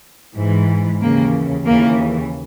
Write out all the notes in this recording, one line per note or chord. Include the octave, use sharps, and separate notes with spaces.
G#2 E3
D#2 C#3 E3 A#3
D#2 C#3 E3 A#3